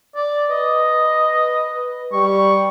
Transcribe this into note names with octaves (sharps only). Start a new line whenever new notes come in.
D5
B4 D#5
G3 C#6